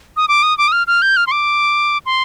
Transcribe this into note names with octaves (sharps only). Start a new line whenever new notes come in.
D#6
D6
D#6
D6
D#6
F6
F6
G6
F6
C6
D6
C6